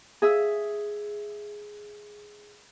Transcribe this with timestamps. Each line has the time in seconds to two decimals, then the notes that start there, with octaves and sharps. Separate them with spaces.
0.22 G#4 E5 E6